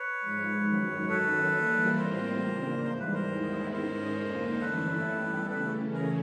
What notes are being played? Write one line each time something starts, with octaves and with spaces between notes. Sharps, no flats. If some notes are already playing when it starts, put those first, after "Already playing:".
Already playing: B4 C#5
G#2 F3 G#3
F#2 D#3 F#3
F#2 D#3 F#3 A4 B4
E3 G3 A#3
A2 E3 G3 C4 F4 A#4 C5
C#3 F3 A#3 D4
G#2 E3 G3 C5
B4
A#4 C5
D#2 D#3 G#3 B3 E4
G#2 D#3 G#3 C#4 A#4 C5
F2 D3 F3 A#3 D#4
G2 E3 A3 C#4 E4 A4 B4
E3 G3 B3 E4 G4
C#3 E3 A3 C#4 A4 B4
G#4 A#4